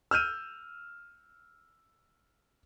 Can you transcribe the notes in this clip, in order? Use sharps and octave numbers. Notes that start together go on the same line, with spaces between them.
E6 F6 G6 D#7